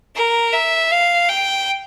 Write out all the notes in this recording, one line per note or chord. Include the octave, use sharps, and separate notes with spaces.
A#4
E5
F5
G5